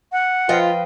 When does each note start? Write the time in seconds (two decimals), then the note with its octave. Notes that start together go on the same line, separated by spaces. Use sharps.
0.12 F#5
0.49 F3 F4 B4 D#5 F5 G5